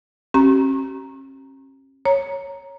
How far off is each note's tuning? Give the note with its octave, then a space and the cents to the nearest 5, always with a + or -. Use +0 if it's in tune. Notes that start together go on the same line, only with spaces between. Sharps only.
C#4 -40 G4 -45 A#5 +0
C#5 +0 A#5 +0